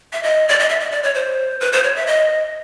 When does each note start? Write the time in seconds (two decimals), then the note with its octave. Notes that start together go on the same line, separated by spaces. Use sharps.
0.13 E5
0.23 D#5
0.48 D5
0.59 D#5
0.69 E5
0.80 D#5
0.91 D5
1.03 C#5
1.14 C5
1.60 B4
1.72 C5
1.84 C#5
1.96 E5
2.07 D#5